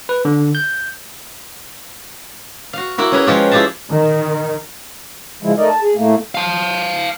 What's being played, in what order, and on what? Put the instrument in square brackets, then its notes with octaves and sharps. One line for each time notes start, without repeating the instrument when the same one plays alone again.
[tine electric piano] B4
D3
G6
[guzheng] F#4 F5
A#3 E4 F#4
C#4 G#4 B4
F3 G#3 F4 G4
E4 F4 G4 G#4 F5 A5
[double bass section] D#3
[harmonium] C#3 F3 G#3 E4
A3 D#4 A#4 D5 D#5
A5
G#4
A2 A3 A#3
[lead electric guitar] F5 A5